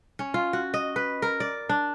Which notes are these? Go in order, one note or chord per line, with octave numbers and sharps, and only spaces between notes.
C#4
F4
F#4
D#5
B4
A#4
D5
D4